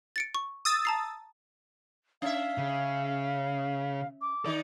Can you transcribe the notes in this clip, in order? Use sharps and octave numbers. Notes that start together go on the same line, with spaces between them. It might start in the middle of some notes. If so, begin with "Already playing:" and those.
A6 C#7 D7
C#6
D#6 E6 A6
A5 A#5 C7
C#4 E5 F5
C#3
D6
D#3 D#4 D5